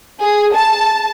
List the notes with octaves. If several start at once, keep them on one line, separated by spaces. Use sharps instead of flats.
G#4
A5